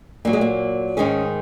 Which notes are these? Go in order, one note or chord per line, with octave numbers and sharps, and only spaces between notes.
A#2 F#3 A#3
G#3
A#3
G#2 D#3 G#3 C#4